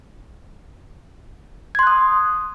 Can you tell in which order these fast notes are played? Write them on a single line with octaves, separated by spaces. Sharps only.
G#6 C6 F#6 D#6